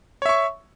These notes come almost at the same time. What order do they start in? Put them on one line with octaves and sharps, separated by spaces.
C#5 E5 C#6